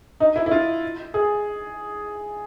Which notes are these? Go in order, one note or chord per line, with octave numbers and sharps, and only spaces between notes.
D#4
E4
E4
F4
G#4